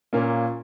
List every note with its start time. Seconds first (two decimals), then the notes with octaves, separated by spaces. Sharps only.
0.13 A#2 A#3 C#4